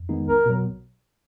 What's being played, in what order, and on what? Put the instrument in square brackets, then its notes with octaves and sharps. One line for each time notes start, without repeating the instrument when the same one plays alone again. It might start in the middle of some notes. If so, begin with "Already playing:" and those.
Already playing: [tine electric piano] F2
D#3 G#3 B3 D#4
[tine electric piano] B1 [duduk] A#4
[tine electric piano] B2 F#3